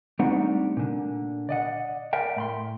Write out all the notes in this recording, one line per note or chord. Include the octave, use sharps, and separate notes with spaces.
G3 A3 C4 D4 D#4 F#5
A#2 D3
D5 D#5 F#5
A#4 D5 E5 F#5 G5
A2 B5 C6